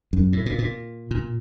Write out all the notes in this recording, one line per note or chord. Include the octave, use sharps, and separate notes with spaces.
F#2
A2
A#2
A#2
A#2